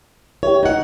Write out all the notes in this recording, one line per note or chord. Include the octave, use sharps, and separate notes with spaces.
E4 G4 C#5
D#4 F#5